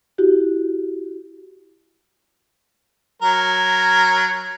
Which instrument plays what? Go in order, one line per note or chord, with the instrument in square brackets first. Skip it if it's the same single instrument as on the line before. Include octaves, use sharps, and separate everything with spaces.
[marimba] E4 F#4 G4
[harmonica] F#3 A#4